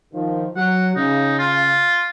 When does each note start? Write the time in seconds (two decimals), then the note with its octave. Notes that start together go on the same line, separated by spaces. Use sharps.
0.14 D#3 F3
0.56 F#3 F#5
0.96 C#3 D#4
1.39 F4